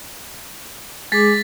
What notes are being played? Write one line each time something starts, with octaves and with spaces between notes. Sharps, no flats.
G#3 G#4 D6 A6 B6